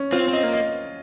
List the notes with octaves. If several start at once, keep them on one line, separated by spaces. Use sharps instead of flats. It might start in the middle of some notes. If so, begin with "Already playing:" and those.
Already playing: C#4
C4 F4
C4
D#5
A#3
D#5